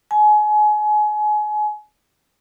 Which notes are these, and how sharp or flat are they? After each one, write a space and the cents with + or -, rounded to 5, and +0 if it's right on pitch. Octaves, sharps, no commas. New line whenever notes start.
G#5 +30